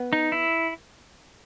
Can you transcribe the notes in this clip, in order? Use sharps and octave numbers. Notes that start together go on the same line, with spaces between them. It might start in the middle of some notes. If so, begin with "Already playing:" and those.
Already playing: B3
D#4
E4